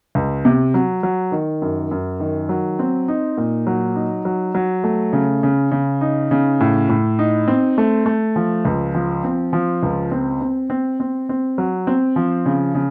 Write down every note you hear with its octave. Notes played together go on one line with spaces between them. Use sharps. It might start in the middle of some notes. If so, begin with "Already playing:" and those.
C#2
C3
F#3
F#3
D#3
F#2
F#2
D#3
F#3
C4
D#4
A#2
F#3
D#4
F#3
F#3
A3
C#3
C#3
C#3
D#4
C#3
A2
A2
D#4
C4
A3
A3
F3
C#2
F3
C4
F3
C#2
C4
C4
C4
C4
C4
F#3
C4
F3
C#3
C#3